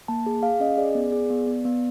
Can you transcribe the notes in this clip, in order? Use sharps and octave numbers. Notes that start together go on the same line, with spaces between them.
A#3 A5
G#4
G#4 F5
C#4 D#5
G#4 D5
B3
G#4
B3
B3
B3